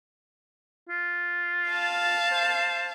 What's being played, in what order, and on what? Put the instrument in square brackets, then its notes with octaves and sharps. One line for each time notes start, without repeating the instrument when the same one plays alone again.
[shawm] F4
[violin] F5 A5
[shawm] C5